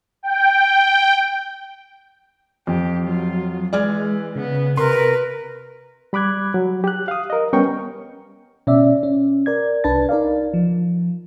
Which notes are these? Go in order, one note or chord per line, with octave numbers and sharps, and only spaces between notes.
G5
F2 G4
F#3 F4
E3 G#3 D5 F6 G#6
C#3 B3
C3 A#4 B4 C6
G3 B5 D6 F#6 G#6
F#3
G4 F#6
F5 D#6
A#4 D#5
G3 B3 C#4 A#4 G5 C#6
B2 C#4 D5 E5
C#4
A#4 D5 G#6
C2 D4 B4 A5 A6
D#4 A#4 D5 F5
F3